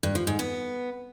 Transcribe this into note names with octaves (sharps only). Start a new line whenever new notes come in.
G2
F3
G#2
B3